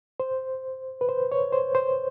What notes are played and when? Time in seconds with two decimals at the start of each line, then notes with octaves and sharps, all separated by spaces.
0.20 C5
1.01 B4
1.09 C5
1.32 C#5
1.53 C5
1.75 C5